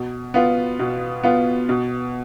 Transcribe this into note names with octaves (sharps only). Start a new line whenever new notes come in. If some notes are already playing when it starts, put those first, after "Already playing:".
Already playing: B2
B3 F4
B2
B3 F4
B2